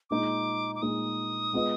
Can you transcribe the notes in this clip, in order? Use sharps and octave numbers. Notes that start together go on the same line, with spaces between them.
A#2 G#3 D#4 D6
D6
A#2 G#3 D#4 D#6
G#3 B3 F4 B4 D#5